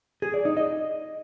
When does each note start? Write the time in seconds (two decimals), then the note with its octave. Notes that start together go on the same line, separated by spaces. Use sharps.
0.22 G#4
0.34 D5
0.45 D#4
0.57 D#5